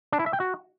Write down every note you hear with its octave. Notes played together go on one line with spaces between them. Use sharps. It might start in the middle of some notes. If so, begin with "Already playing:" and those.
D4
E4
E5
G5
F#4